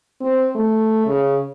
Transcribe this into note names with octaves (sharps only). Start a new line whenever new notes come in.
C4
A3
C#3